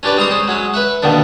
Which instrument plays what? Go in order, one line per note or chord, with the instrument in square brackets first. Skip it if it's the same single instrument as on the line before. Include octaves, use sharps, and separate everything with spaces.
[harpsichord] C#4 D4 G4 B4 D5
G3 G#3 C4 A#5 C6 D#6
C#4 C5
F#3 G#3 C#4
B4 E5 F#5
D#2 B2 D3 D#3 D4